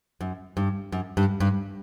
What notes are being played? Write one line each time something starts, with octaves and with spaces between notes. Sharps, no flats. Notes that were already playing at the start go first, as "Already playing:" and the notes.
F#2
G2
F#2
G2
G2